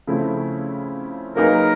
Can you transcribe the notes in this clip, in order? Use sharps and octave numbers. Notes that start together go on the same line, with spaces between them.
C#3 F3 A3 C4 E4
F#3 A#3 D#4 G#4 A#4 B4